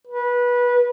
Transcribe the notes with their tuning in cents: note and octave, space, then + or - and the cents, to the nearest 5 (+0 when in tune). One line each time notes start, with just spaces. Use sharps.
B4 -20